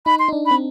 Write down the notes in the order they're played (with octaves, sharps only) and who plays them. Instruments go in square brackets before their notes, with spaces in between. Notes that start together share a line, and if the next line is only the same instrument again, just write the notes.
[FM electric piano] D#4 [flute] B5
[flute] C6
[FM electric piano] D#4
D4
[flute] B5
[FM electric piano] C4